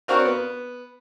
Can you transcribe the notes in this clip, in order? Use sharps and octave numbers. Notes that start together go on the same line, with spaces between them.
C4 D4 F#4 A#4 C#5 F5
B3